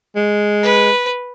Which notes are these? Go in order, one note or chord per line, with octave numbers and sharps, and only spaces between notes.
G#3
B4